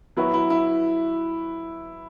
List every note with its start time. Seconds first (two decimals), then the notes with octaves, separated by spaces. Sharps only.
0.17 F#3 B3 E4 F#4 B4
0.34 E4
0.50 E4